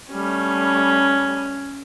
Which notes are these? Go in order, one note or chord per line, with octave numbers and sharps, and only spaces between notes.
G3 A3 C#4